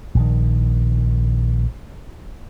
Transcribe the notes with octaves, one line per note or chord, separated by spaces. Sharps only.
A#1 D#3